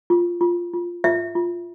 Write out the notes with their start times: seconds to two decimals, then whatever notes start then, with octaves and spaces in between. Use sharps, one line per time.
0.10 F4
0.41 F4
0.73 F4
1.04 F4 E5
1.35 F4